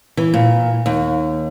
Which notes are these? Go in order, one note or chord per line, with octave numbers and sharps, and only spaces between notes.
E3
A#2
D#2